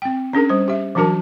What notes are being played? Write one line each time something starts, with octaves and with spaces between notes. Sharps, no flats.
C4 G5
C#4 D4 G#4 A#4
G3 C5
G4 E5
E3 F#3 D4 F#4 A#4 A5